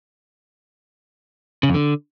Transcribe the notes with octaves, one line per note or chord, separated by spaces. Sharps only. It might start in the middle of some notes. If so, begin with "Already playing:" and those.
C#3
F2
D3